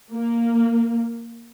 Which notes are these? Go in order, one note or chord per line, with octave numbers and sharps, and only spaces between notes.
A#3